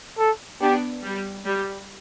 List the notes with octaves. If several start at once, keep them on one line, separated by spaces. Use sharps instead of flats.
A4
B3 D4 G4
G3
G3